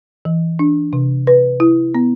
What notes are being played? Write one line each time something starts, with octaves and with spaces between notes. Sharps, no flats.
E3
D4
C3
B4
E4
B3